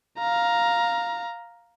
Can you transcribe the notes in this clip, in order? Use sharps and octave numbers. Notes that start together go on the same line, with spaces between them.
F5 A#5